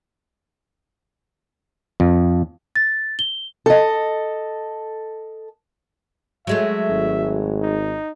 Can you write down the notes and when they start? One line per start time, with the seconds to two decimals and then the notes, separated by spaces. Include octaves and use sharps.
2.00 F2
2.76 A6
3.19 G7
3.66 A4 D#5
6.47 F#3 G#3 A3 E5
6.90 G#1
7.62 D#4